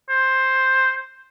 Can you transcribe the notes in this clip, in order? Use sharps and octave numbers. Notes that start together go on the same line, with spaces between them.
C5